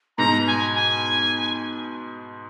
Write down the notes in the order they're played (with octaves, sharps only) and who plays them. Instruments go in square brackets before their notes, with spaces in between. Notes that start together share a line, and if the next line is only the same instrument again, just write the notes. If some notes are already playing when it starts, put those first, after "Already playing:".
[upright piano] G#2 B2 [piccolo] A#5
[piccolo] G#5
G#5